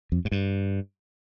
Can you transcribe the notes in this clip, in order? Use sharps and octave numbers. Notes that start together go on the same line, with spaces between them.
F2
G#2
G2